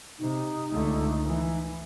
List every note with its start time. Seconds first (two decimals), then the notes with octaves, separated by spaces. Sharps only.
0.19 C3 D#4
0.71 C#2 D3 A3
1.25 E3